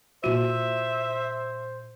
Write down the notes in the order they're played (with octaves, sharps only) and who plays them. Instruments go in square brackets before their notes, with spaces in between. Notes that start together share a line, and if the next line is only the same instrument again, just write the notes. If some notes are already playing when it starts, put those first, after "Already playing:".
[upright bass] A#2 E4 [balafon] F#4 [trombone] C5 [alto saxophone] E5